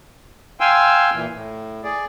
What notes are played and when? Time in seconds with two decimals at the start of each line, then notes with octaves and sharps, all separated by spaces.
0.60 F5 G5 G#5 C6 E6
1.14 A#2 E3
1.33 A2
1.84 G#4 D5